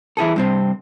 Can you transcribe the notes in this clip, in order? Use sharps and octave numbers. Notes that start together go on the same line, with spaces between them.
E3 E4 G#4 A4
G2 C3 C4